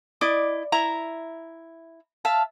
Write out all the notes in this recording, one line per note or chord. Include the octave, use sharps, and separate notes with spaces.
E4 D5 D#5 D6
E4 E5 A#5
E5 F5 A5